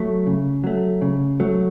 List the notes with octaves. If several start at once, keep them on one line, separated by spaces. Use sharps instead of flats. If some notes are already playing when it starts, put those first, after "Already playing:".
Already playing: F#3 A3
C#3
F#3 A3
C#3
F#3 A3